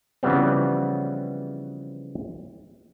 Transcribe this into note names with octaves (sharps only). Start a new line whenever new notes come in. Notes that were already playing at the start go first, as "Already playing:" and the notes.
C#3 E3 F3 G3 B3 C4